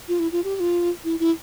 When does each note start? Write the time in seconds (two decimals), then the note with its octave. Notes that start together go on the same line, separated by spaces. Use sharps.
0.08 F4
0.19 E4
0.32 F4
0.44 G4
0.56 G4
0.60 F4
1.04 E4
1.20 E4